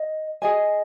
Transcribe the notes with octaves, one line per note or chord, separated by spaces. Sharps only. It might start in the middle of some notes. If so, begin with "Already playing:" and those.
Already playing: D#5
G#4 D#5 G#5